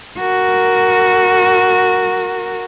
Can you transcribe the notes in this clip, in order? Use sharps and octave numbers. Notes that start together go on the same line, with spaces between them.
F#4 A#4